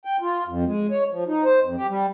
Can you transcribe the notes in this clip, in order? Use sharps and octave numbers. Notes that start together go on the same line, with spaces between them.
G5
F4
F2
G#3
C#5
F3
D#4
C5
F2
G4
G3